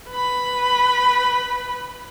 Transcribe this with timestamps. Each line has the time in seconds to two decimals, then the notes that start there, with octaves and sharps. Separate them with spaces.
0.10 B4 B5